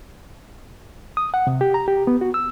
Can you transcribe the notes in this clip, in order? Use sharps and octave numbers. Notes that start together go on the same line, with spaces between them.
D#6
F#5
C3
G4
A#5
G4
B3
F#4
E6